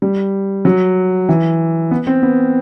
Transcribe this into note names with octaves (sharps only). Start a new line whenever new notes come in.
G3
F#3
E3
B3
C4
B3